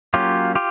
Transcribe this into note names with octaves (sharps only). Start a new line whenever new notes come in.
F#3 A#3 C#4 F4 G4
F4 G4